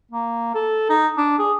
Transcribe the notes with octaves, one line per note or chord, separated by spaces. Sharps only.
A#3
A4
D#4
D4
G#4